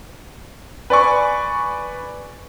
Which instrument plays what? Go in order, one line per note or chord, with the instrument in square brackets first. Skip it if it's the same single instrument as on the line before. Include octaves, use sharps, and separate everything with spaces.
[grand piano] B4 D5 G#5 C#6